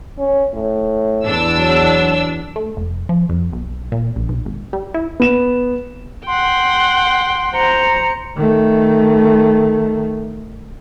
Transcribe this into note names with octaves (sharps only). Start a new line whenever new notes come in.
C#4
A2
E2 D4 E6
F#3
A3
F1
F3
F2
B1
A#2
A#1
B1
G#1
G3
E4
B3 E7
F#5 G5 C6
C5 A#5 C#7
D#3 A3